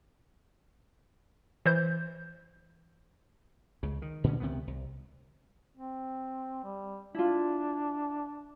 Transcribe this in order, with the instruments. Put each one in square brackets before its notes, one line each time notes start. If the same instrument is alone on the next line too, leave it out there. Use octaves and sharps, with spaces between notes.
[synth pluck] E3 C5 G6
[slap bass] C#2 C#3
D#3
A#2 D3 E3 C#4
C#2 C3 D#3 B3
C2
[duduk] C4
G3
[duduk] D4 [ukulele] E4 F4